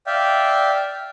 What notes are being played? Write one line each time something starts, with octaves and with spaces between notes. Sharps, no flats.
D5 E5 F5 G5